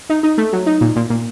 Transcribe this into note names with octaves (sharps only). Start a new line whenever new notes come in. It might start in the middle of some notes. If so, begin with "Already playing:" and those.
D#4
D#4
A3
F#3
D#4
A#2
A#2
A#2